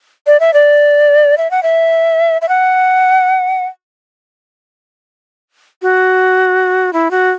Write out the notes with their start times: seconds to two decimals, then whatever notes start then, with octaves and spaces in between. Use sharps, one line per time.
0.27 D5
0.40 E5
0.54 D5
1.38 E5
1.51 F#5
1.63 E5
2.42 E5
2.49 F#5
5.82 F#4
6.93 E4
7.11 F#4